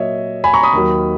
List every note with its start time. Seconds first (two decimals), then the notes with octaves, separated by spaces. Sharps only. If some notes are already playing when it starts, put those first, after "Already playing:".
Already playing: A#2 F#3 C#5 D#5 E5
0.44 G#5 B5
0.54 A#5 C#6
0.63 B5 D#6
0.73 D#2 D#3 F#3